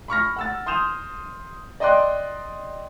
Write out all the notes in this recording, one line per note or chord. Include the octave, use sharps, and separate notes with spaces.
B5 C#6 F6 A#6
F#5 E6 A6
C6 D#6 G6 E7 F7
D5 D#5 G5 C6 D6 F#6